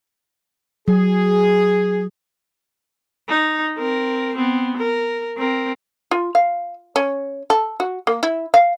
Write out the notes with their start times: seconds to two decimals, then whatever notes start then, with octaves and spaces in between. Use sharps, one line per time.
0.88 F#3 G#4
3.29 D#4
3.78 C4 A#4
4.35 B3 C4
4.77 A#4
5.37 C4 A#4
6.11 F4
6.35 F5
6.96 C#4
7.50 A4
7.80 F#4
8.07 A#3
8.23 E4
8.54 F5